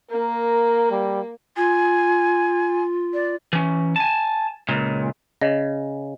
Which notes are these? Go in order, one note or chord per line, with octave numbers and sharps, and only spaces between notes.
A#3 A#4
G3
F4 G#5
D5
E3 C#4
G#5 A5
C#2 A#2
C#3 D#5